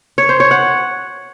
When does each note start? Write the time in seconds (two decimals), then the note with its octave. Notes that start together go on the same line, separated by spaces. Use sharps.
0.18 C#5
0.29 C5
0.40 C#5
0.51 F#5